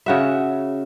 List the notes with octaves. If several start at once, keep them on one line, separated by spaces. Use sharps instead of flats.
C#3 F#4 E5